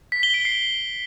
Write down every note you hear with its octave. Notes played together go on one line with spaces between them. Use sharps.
B6
G7
D7
C7